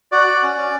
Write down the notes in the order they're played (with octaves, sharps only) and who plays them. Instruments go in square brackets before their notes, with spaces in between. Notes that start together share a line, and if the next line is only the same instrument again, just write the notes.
[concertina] F#4 D5
F#4
C#4
C#4